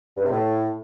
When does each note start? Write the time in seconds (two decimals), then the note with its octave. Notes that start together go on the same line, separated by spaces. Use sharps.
0.17 G2
0.24 C3
0.31 A2